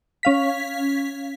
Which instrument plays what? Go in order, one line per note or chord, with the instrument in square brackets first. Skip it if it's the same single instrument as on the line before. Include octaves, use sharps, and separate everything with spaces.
[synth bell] C#4 F5 B6